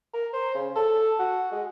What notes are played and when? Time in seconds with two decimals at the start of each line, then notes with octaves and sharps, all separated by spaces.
0.14 A#4
0.33 C5
0.55 C#3
0.76 A4
1.19 F#4
1.52 G#3